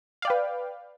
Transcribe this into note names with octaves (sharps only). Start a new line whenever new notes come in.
B4 D5 F5 G5